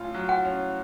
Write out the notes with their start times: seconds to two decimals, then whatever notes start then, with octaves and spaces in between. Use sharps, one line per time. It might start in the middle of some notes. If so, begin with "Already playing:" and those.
Already playing: A2 C#4 F4
0.14 F#3
0.29 F#5
0.45 C#4